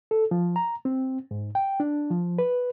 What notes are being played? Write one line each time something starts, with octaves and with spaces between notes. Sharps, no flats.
A4
F3
A#5
C4
G#2
G5
D4
F3
B4